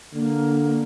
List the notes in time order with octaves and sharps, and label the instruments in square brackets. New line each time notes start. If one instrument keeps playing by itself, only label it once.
[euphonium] D3 [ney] A#3